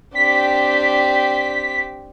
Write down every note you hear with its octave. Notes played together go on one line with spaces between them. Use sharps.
C4 D4 G4 B6